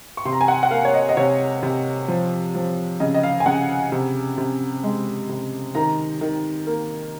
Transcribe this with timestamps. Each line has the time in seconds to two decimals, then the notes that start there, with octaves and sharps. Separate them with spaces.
0.17 C#6
0.25 C3 C6
0.33 A#5
0.41 G#5
0.48 F#5
0.63 F#5
0.71 A#3 F5
0.85 C#5
0.94 D#5
1.09 D#5
1.17 C3 C#5
1.63 C3
2.08 F3
2.55 F3
3.00 C#3 D#5
3.14 D#5
3.23 F5
3.40 G#5
3.46 C#3 F#5
3.92 C3
4.38 C3
4.84 G#3
5.29 C3
5.75 D#3 A#5
6.21 D#3
6.67 A#3